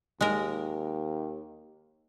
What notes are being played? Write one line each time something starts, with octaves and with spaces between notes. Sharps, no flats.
D#2 G#3 A#4